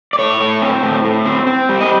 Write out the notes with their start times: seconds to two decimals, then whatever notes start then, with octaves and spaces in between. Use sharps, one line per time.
0.13 D5
0.19 A2 C#5
0.40 A2
0.62 C4
0.83 A2
1.05 A2
1.25 C4
1.47 C4
1.69 G3
1.81 D#5